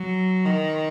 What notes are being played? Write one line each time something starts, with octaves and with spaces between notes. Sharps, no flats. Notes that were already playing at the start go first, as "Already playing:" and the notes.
Already playing: F#3
D#3